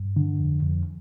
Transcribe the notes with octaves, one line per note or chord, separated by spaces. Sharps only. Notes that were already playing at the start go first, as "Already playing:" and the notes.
Already playing: G2
D3
F2
F2